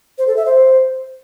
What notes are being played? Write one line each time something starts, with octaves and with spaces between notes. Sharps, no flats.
C5
A4
E5
C5